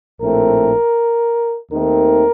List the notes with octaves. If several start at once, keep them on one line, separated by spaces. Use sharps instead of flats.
A#1 A2 A3 C4 A#4
D#2 D#3 A3 C4 A#4